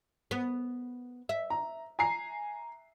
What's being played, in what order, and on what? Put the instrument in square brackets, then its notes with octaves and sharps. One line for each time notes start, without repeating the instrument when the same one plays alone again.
[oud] B3
E5
[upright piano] A#5
G#5 A#5 C7